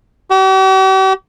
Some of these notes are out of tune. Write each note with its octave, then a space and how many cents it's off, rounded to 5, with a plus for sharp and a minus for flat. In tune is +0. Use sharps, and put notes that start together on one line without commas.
G4 -45